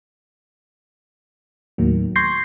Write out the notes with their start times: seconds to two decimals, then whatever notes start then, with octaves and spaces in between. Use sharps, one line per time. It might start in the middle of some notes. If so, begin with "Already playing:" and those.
1.78 D#2 A2 D#3 F#3 A#3
2.16 C6 C#6 G6 G#6 A#6 C7